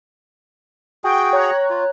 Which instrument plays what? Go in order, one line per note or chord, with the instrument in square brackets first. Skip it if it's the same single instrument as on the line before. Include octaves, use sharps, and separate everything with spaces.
[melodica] F#4 G#4 [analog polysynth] G5
[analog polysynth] C#5 A#5 F#6
[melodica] F4